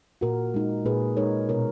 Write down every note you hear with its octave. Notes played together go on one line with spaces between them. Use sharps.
A#2 F#4 A#4
G#3 D#4
A#2 G#4 B4
G#3 D#4 A#4 C#5
B2 A#4 C#5